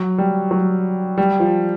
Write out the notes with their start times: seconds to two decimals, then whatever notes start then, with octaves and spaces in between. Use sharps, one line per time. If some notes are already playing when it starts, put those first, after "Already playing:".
Already playing: F#3
0.18 G3
0.51 F#3
1.18 G3
1.40 F3